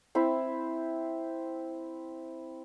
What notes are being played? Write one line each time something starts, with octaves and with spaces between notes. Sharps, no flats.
C4 E4 E5